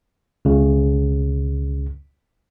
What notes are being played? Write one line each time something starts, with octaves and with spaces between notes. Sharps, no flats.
C#2 C#3